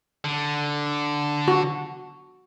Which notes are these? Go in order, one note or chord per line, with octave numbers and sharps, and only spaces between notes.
D3
F#4